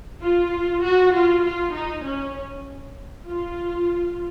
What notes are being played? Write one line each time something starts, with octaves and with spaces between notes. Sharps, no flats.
F4
F#4
F4
F4
D#4
C#4
F4